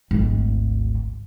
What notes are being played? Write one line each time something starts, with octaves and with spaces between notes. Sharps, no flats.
G#1 D2